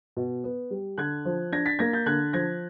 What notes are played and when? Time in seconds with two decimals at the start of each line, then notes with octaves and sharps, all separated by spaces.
0.17 B2
0.44 B3
0.70 G3
0.98 D3 F#6 G#6
1.25 F3
1.52 D4 G#6 A#6
1.66 A6 B6
1.79 A#3 G#6 A#6
1.93 G6 A6
2.06 D3 F#6 G#6
2.33 F3 G#6 A#6